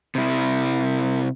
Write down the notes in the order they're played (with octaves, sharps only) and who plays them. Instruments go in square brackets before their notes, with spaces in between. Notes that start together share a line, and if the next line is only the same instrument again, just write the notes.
[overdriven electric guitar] C3 E4